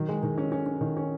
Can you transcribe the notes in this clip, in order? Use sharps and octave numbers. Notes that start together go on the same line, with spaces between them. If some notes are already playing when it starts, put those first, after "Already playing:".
Already playing: D#3 F#3
G#3
D#3
C#4
C#4
C#4
D#3
C#4